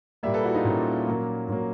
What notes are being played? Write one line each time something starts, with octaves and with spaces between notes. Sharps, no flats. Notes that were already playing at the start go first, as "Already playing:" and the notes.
A#2 G3 A#3 D5 E5
A4 B4
E4 F#4
D#4 F4
A#2 G3 A#3 C#4
A#2 F#3 A#3
A#2 F#3 A#3